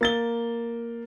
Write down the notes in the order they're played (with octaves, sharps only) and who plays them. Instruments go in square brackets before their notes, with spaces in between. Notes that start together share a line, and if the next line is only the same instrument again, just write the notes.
[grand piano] A#3 A6 G7